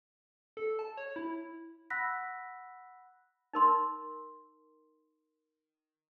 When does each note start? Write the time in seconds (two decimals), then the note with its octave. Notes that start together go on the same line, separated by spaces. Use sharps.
0.57 A4
0.79 A5
0.97 C#5
1.16 E4
1.90 F#5 B5 E6 F#6 A#6 B6
3.53 D#4 A#4 C6